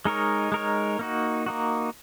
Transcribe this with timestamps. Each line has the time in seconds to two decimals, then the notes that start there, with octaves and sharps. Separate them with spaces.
0.05 G#3 D#4 A#4 C#5
0.52 G#3 D#4 A#4 C#5
0.99 A#3 D#4 F#4
1.46 A#3 D#4 F#4